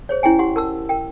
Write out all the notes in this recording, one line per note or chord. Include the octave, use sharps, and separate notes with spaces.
G#4 C5 C#5
C#4 E4 G#4 G5 G#5
G4 F#5 C6
A#4 A5 E6
A#4 G5